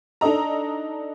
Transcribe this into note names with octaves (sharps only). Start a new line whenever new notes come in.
D4 D#4 A4 D#5 A#5